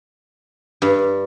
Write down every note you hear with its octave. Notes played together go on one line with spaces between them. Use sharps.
G2